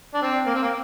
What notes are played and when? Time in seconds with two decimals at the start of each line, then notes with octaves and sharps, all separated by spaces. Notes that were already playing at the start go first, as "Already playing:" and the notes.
0.14 D4
0.22 C4
0.47 A#3
0.55 C4
0.62 A#3